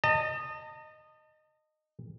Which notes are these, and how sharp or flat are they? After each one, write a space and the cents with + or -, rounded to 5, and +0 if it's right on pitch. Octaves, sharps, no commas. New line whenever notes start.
D#5 -15 A5 +40